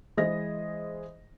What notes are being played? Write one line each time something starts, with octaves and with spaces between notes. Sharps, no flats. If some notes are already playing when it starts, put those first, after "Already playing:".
E3 G#3 G#4 C5 D#5 A#6